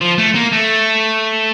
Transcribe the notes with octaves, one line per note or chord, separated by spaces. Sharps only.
F3
A3
A#3
A3